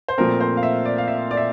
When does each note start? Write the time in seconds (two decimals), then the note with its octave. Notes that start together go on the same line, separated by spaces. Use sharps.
0.09 C5
0.18 A#2 F3 A3 C4 A#4
0.40 C5
0.57 F5
0.63 E5
0.85 D5
0.98 F5
1.08 E5
1.31 D5
1.37 E5